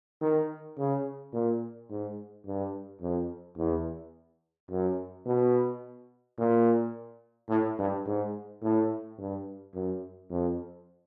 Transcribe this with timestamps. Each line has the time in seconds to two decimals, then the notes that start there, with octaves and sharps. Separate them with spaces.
0.21 D#3
0.78 C#3
1.33 A#2
1.90 G#2
2.46 G2
3.01 F2
3.58 E2
4.70 F#2
5.26 B2
6.38 A#2
7.49 A2
7.78 G2
8.05 G#2
8.62 A2
9.19 G2
9.74 F#2
10.30 F2